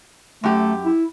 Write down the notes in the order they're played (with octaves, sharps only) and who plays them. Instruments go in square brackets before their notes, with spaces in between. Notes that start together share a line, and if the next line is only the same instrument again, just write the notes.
[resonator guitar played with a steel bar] F#2 G4 [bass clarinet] A3
[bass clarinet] E4